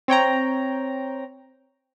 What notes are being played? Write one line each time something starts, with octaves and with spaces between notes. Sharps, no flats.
C4 C#5 G5 A#5